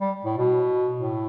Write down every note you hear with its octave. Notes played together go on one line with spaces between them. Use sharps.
G3
A2
B2
A2